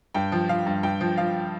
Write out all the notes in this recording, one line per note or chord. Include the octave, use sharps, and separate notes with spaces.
G2 G5
F3
F3 F5
G2
G2 G5
F3
F3 F5